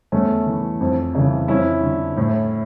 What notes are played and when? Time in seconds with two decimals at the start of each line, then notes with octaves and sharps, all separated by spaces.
0.12 E2 A3 C#4
0.46 E3
0.81 F2
1.15 C#3 E3
1.48 F2 C#4 E4
1.83 D3
2.17 A2